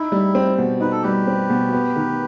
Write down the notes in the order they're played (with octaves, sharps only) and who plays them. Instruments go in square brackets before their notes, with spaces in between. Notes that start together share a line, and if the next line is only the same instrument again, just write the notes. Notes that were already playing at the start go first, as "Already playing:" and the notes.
Already playing: [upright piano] D#4 [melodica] E4
[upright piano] G3
C4
B2
[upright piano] D#4 [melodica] B4
[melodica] A4
[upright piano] G3 [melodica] G4 B4
[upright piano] C4
B2
B3
D#3